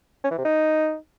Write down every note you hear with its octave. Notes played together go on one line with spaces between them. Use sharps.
C#4
E3
C3
D#4